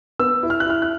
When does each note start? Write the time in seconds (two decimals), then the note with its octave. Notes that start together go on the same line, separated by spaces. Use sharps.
0.20 B3 E6
0.43 E4
0.50 F6
0.60 F#6
0.66 E4 F6
0.82 F#6